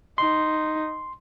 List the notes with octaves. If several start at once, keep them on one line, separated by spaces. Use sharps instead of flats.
D#4 C6